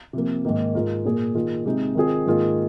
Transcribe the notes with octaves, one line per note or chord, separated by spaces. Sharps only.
C3 F3 A#3
G#2 D#3 A#3
G#2 G#3 F4 A#4
A#2 A#3 G#4
D#3 A#3 F4 G#4
C3 G#3 D#4
D#3 C4 F4 G#4
G#2 D#3 A#3 F4 G#4